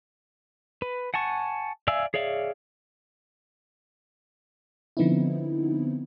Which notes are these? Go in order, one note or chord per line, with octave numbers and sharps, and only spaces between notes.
B4
F#5 G#5 A5 C#6
D5 E5 F5 G#5 E6
G#4 C#5 D5 E5 F5
D3 F3 B3 C4 D#4 E4